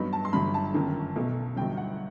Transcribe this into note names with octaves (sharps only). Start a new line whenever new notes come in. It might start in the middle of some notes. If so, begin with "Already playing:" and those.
Already playing: G2 F#3 B3 D#4 B5
A5
C6
G1 G2 F#3 B5
A5
G1 F#2 D#3
B1 B2 A3
G1 G2 F#3 G5
F#5